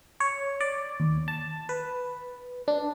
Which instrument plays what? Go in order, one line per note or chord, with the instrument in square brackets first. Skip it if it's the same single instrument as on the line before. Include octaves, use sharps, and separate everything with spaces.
[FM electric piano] C#5
D5
D#2
A5
B4
D4